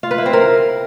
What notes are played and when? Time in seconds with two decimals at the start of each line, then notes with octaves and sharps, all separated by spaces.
0.03 F4
0.11 B4
0.18 E4
0.26 C4
0.33 A#4